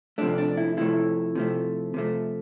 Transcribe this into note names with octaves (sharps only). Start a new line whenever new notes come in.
C3 F3 A3 D4
D4
E4
C3 F3 A3 E4
C3 F3 A3
C3 F3 A3